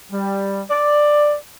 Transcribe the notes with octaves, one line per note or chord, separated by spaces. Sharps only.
G3
D5